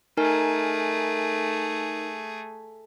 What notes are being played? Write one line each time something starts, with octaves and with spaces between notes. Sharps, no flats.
A3 D#4 G#4 A#4 G#5